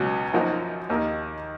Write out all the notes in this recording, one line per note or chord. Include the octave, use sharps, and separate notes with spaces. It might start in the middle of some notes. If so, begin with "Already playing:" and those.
Already playing: C#2 B2 F#3 C#4 F#4
F#2 F3 A#3 D#4 F#4
D#2 D#3 A#3 D#4